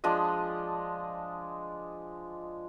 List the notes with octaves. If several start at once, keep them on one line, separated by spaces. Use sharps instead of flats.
F3 G#3 D4 D#5